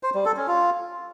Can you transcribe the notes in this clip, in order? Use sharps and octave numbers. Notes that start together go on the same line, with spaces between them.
C5
G3
A4
C#4
F4